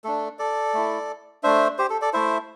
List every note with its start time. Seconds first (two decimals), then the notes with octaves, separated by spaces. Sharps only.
0.04 A3 D4 A4
0.39 A4 D5
0.74 A3 E4
1.43 A3 D4 C5 E5
1.78 G4 C5
1.90 A4
2.02 A4 D5
2.13 A3 E4 C5 E5